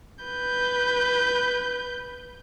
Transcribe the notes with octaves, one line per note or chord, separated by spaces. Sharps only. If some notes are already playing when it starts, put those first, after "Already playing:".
B4 G6